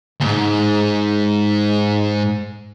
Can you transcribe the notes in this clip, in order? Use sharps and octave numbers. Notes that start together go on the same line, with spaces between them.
D2 G#2